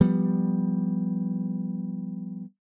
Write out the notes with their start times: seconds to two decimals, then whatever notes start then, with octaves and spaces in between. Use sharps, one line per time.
0.01 F3 G3 B3